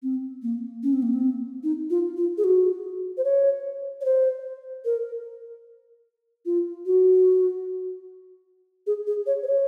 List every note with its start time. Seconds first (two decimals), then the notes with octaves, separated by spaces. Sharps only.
0.03 C4
0.43 A#3
0.83 C#4
0.93 C4
1.02 A#3
1.13 C4
1.64 D#4
1.90 F4
2.17 F4
2.38 G#4
2.44 F#4
3.17 C5
3.24 C#5
4.01 C#5
4.05 C5
4.85 A#4
6.46 F4
6.86 F#4
8.87 G#4
9.07 G#4
9.27 C#5
9.43 C5
9.47 C#5